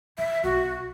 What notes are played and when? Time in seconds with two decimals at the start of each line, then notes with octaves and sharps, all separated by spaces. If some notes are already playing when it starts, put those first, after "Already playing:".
0.18 E3 E5
0.44 B1 F#4